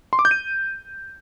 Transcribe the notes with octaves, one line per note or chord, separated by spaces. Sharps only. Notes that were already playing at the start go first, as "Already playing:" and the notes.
C6
D6
G6
D#7